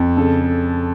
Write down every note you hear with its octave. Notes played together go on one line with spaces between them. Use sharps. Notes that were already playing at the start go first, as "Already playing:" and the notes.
Already playing: F2
C#3 A4